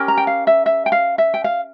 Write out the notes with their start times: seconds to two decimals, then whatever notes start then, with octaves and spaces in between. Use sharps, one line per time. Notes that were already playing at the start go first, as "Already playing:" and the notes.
Already playing: C#4 G4 A#4
0.08 A#5
0.17 G5
0.27 F5
0.47 E5
0.66 E5
0.86 G5
0.92 F5
1.18 E5
1.34 G5
1.44 F5